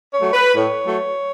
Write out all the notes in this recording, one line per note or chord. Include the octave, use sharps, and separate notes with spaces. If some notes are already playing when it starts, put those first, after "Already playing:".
C#5
F#3 A3
B4
A2 C#5
F#3 A3